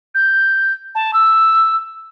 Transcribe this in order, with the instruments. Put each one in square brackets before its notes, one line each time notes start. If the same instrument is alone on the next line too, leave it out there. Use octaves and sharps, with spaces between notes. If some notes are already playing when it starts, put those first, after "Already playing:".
[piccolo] G6
A5
E6